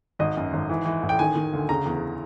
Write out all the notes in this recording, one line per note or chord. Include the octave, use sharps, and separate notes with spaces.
G#1 D#5
F#2
G#1
E3
E3
A1
G5
D#3 G#5
D#3
D2
C#3 A#5
E2